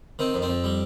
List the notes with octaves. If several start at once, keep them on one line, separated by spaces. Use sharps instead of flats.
D#3 C4
F2
C4
F2
G3